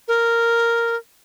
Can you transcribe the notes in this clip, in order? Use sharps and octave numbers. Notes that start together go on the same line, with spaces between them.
A#4